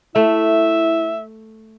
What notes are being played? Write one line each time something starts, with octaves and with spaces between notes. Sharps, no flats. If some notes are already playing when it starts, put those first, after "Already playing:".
A3 E4 E5